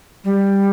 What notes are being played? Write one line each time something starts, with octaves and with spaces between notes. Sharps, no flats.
G3